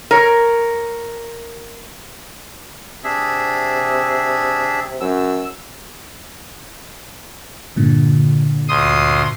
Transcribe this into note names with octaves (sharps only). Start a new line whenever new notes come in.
A#4 C#5
C3 D4 G#4 E5
F#2 E6
G2 A#2 D3
D2 C6 D#6